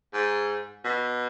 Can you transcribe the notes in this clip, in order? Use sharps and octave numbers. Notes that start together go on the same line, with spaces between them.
G#2
B2